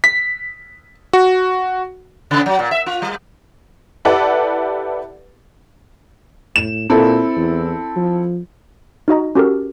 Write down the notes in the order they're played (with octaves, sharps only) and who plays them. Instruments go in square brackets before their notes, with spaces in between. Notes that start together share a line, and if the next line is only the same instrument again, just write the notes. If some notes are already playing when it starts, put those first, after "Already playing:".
[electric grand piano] B6
F#4
[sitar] C#3
F#3
A#2
E5
F4
G3
[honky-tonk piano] E4 G4 A4 B4 D5 F#5
[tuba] A2 [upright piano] E7
[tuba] A#2 [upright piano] C4 E4 A4
[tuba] E2
F3
[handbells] D#4 F#4 D#5 A#5
C#4 F#4 G4 A4 A#4